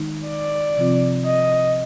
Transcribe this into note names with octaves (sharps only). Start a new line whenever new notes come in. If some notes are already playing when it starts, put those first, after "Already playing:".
Already playing: D#3 G#3 D#4
D5
C3 F3 C4 F4
D#5